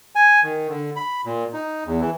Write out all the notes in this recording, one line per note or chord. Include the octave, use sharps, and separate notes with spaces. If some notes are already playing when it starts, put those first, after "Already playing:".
G#5
D#3
D3
B5
A#2
D#4
E2
E3